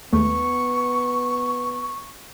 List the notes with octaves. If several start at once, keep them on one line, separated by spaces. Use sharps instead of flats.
D#2 G#3 A3 B3 C#6